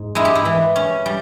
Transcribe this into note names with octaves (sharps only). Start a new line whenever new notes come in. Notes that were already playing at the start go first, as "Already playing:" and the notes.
Already playing: G#2
G#3 E4
G4
E4
E3
C#4
G3